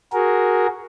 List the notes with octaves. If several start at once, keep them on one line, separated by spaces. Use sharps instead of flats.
F#4 G#4 A#4